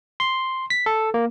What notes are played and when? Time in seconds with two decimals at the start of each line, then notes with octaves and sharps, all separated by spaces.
0.20 C6
0.70 B6
0.86 A4
1.14 A#3